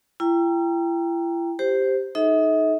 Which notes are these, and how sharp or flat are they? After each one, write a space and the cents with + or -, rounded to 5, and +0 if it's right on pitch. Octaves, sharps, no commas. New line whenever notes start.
E4 +40 G5 +10 A#5 +0
G4 +0 C5 +0
D#4 +0 A4 -45 E5 -45